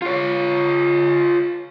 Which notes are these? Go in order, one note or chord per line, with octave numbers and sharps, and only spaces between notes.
F4 C#5